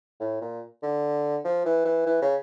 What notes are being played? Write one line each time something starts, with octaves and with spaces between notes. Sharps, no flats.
A2
A#2
D3
F3
E3
E3
E3
C#3